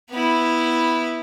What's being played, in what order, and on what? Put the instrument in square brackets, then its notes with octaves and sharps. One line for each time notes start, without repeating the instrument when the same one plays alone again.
[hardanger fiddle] B3 E4